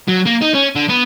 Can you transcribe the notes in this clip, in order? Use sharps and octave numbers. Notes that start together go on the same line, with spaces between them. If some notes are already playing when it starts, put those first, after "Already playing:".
F#3
A#3
D#4
C#4
D3
B3